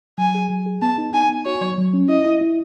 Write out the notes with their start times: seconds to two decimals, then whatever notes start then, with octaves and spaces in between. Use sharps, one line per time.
0.18 F#3 G#5
0.35 G#4
0.50 F#3
0.66 G#4
0.82 B3 A5
0.98 D#4
1.13 D#4 G#5
1.29 B3
1.46 F#4 C#5
1.61 F#3
1.78 F#3
1.94 C#4
2.09 E4 D#5
2.26 E4
2.41 E4